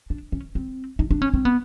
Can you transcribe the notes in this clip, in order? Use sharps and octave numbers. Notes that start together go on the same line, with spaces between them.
D4
C#4
C4
D#4
D4
C#4
C4
B3